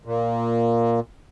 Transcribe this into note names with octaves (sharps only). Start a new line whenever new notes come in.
A#2